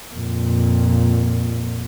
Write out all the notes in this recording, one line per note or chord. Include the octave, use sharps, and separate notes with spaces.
F2 A#2